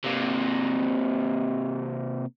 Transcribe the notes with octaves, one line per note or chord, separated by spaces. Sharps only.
C3 A#3